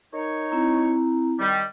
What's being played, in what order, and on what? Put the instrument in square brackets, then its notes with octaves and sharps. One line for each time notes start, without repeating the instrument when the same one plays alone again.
[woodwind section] D#4 C#5 [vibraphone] A#4
[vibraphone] C4 E4 A#5
[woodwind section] D#3 G3